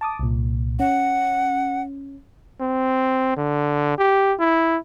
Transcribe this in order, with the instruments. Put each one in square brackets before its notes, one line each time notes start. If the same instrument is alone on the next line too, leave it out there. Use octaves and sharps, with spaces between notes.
[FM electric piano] A5 D6 D#6
C2 A#2
[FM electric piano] C#4 [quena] F#5
[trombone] C4
D3
G4
E4